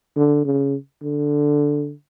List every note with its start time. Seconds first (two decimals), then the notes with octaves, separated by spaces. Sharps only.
0.17 D3
0.45 C#3
1.03 D3